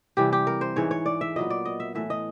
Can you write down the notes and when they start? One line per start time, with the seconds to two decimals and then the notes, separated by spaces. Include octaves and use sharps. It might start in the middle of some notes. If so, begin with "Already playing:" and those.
0.17 C3 E3 G3 G4
0.33 G4
0.47 A#4
0.61 C5
0.76 G#2 E3 G#3 C#5
0.91 C#5
1.06 D5
1.21 E5
1.36 A#2 F#3 B3 D#5
1.50 D5
1.65 D#5
1.80 E5
1.95 A2 E3 A3 E5
2.10 D#5